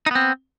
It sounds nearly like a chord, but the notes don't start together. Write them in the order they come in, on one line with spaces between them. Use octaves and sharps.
D#4 B3 C4